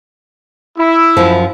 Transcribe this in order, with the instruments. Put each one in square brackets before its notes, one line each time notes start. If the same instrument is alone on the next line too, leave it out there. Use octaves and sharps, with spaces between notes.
[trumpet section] E4
[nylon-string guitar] F#2 F3